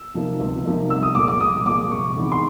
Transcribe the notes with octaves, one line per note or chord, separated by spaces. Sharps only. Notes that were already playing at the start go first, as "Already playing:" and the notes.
Already playing: E6
C3 F3 A#3 D#4
C#2
C3 F3 A#3 D#4
C2 E6
D#6
A#2 F3 G#3 D6
D6
C2 D#6
A#2 F3 G#3 D6
C3 C#6
E3 G#3 B3 D#4
C6